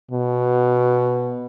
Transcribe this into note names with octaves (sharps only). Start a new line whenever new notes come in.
B2